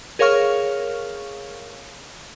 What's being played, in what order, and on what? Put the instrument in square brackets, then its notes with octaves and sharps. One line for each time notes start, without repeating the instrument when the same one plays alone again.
[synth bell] G#4 A#4 C#5 F5 C#6 F6